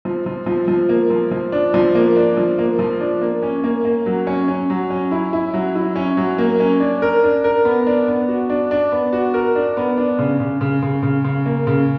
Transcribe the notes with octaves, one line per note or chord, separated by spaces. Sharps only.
F3
F3
F3
F3
A#3
F3
F3
D4
F3
A#3
D4
F3
A#3
F3
D4
A#3
C#4
A#3
A#3
F#3
C#4
C#4
F#3
C#4
E4
E4
F#3
E4
C#4
F#3
A#3
C#4
D4
A#4
D4
A#4
B3
D4
B3
F#4
D4
D4
B3
F#4
A#4
D4
B3
D4
C#3
C#3
C#3
C#3
C#3
C#3
A#3
C#3